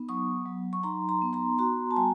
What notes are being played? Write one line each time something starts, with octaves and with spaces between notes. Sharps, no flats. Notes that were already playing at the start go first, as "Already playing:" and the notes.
Already playing: B3 D#4
F#3 C#6 D#6
F#3
C#6
D#4 A#5 C6
A#5 C6
B3
A#5 C6
F#4 A#5 C6
A5
G3 G#5 A#5